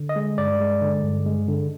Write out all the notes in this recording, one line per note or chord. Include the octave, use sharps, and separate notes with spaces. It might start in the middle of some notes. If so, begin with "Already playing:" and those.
Already playing: D3
D#5
G#3
G2 D5
G#3
D3
G2
G#3
D3